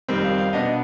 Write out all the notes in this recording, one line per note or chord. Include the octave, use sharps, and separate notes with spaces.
F2 D#3 G3 C4
F5
F5
B2 B3 D4 D#5